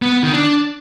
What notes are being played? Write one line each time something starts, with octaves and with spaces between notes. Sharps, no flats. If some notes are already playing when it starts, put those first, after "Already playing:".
B3
B3
D#3
D4